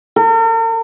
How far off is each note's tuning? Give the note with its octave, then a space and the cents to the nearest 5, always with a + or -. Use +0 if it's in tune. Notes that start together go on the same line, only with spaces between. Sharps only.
A#4 -45